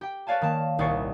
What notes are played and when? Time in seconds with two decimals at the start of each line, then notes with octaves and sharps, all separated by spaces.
0.01 G4 G5
0.27 B4 C#5 D5 F5 G#5 A5
0.41 D#3 A#3 A5
0.78 D#1 C2 D5 C#6 C7 C#7